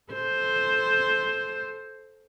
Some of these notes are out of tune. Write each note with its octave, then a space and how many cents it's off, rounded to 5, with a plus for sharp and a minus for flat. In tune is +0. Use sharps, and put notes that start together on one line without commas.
A4 -15 C5 +0